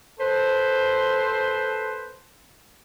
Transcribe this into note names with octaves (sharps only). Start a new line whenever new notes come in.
A4 B4 C5